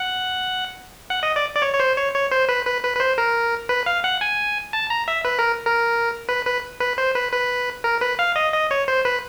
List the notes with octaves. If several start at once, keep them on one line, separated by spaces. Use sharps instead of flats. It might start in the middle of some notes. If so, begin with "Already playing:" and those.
Already playing: F#5
F#5
D#5
D5
D5
C#5
C#5
C5
C#5
C#5
C5
B4
B4
B4
B4
C5
A#4
B4
F5
F#5
G#5
A5
A#5
E5
B4
A#4
A#4
B4
B4
B4
C5
B4
B4
A#4
B4
F5
D#5
D#5
C#5
C5
B4